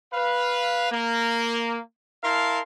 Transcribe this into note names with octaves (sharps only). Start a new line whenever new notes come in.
B4 F5
A#3
E4 A#4 F5 A5 C6